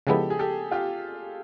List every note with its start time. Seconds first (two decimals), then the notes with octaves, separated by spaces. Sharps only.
0.07 C#3 F3 G#3 B3 E4 G4 A4
0.30 G#4
0.39 G4 A4
0.71 F4 G4